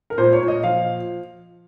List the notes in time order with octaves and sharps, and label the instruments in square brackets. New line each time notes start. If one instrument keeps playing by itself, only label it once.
[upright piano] A#4
A#2 C5
C#5
A#2
D#5
F3 F5